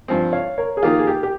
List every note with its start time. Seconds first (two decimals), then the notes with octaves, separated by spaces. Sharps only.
0.08 G2 F3 C4
0.33 C#5 F5
0.58 A#4 C#5
0.77 G#4
0.83 D#3 A#3 F4 G4 A#4
0.99 G#4
1.07 G4
1.23 G4